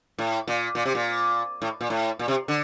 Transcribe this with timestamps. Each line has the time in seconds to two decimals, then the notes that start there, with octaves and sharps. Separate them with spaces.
0.18 A2
0.48 A#2
0.75 A#2
0.85 C3
0.95 A#2
1.62 A2
1.81 A#2
1.90 A2
2.19 A#2
2.28 C3
2.48 D3